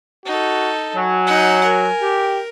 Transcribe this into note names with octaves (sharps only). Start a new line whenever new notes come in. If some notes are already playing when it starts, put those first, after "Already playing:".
D#4 F#4 A4
F#3 G#5
D#4 F#5
A#4
G4